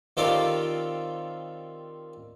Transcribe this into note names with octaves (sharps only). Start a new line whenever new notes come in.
D#3 C4 F4 G4 A4 D5